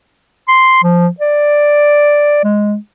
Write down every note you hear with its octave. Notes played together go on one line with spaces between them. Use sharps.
C6
F3
D5
G#3